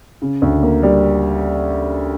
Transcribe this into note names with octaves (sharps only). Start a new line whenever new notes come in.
C#3
D2
A#3
G3